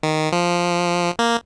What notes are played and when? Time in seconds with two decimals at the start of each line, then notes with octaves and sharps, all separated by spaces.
0.03 D#3
0.32 F3
1.19 A#3